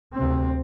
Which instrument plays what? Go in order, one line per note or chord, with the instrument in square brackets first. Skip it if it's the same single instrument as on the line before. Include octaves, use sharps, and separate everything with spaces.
[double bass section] D2 C3 C4